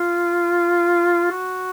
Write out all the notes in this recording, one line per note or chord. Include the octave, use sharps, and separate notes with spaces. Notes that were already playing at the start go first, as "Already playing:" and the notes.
Already playing: F4
F#4